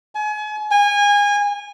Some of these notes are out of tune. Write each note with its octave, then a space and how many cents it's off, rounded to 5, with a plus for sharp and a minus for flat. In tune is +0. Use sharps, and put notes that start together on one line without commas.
G#5 +35
G#5 -25